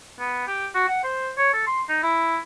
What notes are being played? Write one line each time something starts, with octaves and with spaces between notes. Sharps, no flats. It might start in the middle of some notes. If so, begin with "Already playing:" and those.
B3
G4
F#4
F#5
C5
C#5
A4
C6
D#4
E4